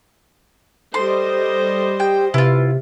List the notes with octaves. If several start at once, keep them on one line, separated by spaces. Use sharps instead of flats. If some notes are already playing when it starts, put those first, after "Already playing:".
G3 A4 C5 D#5 C6
G4 G5
C3 E4 F4 B4